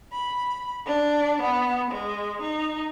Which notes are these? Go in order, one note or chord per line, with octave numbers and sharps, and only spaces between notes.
B5
D4
B3
G#3
D#4